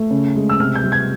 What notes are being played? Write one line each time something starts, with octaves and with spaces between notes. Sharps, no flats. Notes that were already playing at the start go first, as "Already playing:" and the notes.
Already playing: A3
C#3
G#3
E6
C3 F6
G6
G3
G#6